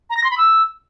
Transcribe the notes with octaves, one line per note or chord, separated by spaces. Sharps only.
A#5
A#6
C6
B5
E6